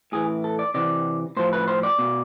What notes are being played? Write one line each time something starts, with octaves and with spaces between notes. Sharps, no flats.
A2 E3 G#4
A4
D5
C3 E3 D5
A2 F3 C5
B4
C5
D5
B2